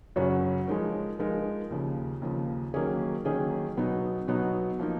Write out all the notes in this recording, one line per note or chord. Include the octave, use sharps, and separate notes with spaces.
F#2 C#3 F#3 C#4 F#4
F3 G#3 D#4 A#4
F3 G#3 D#4 A#4
D#2 C#3 F3
D#2 C#3 F3
D#3 F#3 A#3 C#4 G#4
D#3 F#3 A#3 C#4 G#4
B2 F#3 B3 D#4
B2 F#3 B3 D#4
F3 A#3 D#4